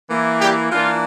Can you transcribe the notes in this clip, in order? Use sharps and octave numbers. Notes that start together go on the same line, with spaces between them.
E3 A#3 E4
G3 G4
E3 A#3 D4 F4